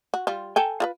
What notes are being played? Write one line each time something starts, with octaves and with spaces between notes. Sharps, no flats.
F#4
G3 F4
A4 G5 G#5
F4 A#4 B4